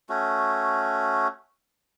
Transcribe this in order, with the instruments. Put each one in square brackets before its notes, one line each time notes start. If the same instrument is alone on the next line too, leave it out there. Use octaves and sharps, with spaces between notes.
[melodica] A3 C#4 F#4